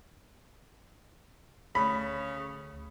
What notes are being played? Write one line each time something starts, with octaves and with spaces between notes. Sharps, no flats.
D2 C#3 B5